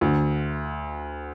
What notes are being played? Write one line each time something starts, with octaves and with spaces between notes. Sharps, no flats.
D2 D3